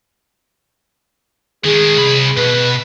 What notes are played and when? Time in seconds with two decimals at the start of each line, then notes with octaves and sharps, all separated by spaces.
1.65 D#3 G#3 G#4
1.97 C2 B5
2.37 B2 B4